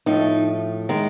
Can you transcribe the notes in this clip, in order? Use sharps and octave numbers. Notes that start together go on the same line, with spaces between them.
A2 F3 A3 D#4
D#3 G#3